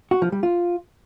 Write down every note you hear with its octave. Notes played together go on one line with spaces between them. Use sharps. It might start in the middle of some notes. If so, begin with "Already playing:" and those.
F#4
F3
G3
F4